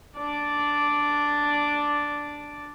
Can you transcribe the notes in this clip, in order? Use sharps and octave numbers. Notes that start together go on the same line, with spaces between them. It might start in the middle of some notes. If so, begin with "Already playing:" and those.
D4 D5